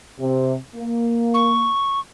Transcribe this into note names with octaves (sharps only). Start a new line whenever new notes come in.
C3
A#3
C#6